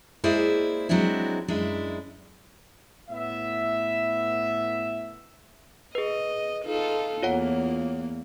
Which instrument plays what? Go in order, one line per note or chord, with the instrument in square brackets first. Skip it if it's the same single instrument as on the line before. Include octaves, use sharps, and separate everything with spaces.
[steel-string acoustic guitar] G#3 A#3 E4 G#4 C5 D5
F#3 G#3 C4 D4 E4
F#2 G#3 D4 E4
[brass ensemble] A2 A3 B3 E4 E5
[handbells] G#4 B4 [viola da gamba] D#5
[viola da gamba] D#4 F4 A4
[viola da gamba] E2 A#3 [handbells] F4 C#5 F#5